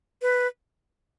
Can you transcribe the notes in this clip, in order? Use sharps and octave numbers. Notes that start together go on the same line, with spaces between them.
B4